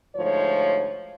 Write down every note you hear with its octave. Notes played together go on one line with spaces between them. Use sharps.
D2 G#2 F3 C#5